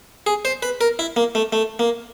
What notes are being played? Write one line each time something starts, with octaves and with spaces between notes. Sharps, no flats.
G#4
C5
B4
A#4
E4
A#3
A3
A3
A#3